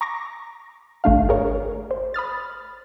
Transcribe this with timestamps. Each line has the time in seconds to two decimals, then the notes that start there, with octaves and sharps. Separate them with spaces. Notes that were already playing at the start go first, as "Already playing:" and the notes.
0.01 A#5 C#6 D6 A#6
1.04 G#1 A3 D4 F5
1.29 G#4 A#4 C#5
1.91 C5
2.14 B5 D#6 F6 A6